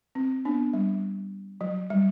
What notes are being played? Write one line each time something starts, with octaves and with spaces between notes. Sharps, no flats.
C4
B3 D4
G3
F#3
G3